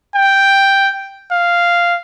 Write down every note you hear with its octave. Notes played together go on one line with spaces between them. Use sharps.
G5
F5